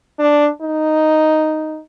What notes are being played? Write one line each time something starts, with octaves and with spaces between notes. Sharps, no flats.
D4
D#4